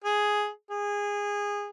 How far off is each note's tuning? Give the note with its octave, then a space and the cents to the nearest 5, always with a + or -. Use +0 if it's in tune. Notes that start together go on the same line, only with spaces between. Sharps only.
G#4 +5
G#4 -20